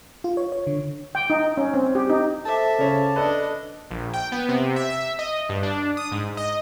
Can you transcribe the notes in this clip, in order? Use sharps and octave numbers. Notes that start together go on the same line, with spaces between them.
F4
C#5
C#5
D3
G5
D#4
C#4
C4
G4
D#4
A4 C5 E5 A5 D6
C#3 C#4
D4 A4 B4 D5 D#5
A#1
G5
B3
C3
E5
E5
D#5
G2
D4
D#6
G#2
D#5